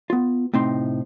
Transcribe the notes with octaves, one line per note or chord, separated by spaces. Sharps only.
B3 F4
A2 C3 C4 D#4 C6